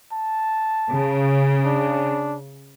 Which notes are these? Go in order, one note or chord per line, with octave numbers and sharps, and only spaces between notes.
A5
C#3
D4